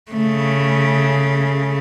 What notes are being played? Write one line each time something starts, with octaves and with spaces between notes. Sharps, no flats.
C#3 A3